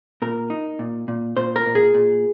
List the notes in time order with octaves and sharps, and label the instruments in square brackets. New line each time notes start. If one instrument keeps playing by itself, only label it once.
[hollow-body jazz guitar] A#2 A#4
D#4
A#2
A#2
A#2 C5
A#4
A#2
G#4
A#2